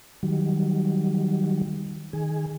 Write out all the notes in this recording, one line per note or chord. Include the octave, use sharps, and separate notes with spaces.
D#3 F#3 G3
D#3 G#4